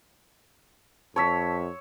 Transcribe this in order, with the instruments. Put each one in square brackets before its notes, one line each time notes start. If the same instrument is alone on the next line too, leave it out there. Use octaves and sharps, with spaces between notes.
[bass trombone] F2 [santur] C#5 E6 [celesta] A5 B6